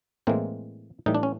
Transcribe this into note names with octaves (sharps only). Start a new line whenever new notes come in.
A2 E3 G#3 A#3 C4
A2 E3 G3 D#4
D4
C#4